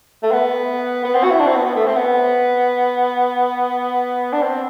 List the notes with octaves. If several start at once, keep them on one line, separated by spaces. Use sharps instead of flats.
A3
B3
B3
C4
F#4
E4
D4
C4
B3
B3
A3
C4
B3
D4
C4